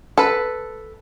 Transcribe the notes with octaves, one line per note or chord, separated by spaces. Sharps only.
A4 B4